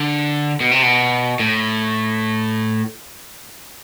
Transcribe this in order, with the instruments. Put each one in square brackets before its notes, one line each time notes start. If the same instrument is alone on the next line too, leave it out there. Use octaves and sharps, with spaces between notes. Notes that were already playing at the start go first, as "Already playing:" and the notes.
Already playing: [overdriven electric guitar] D3
B2
C3
B2
A2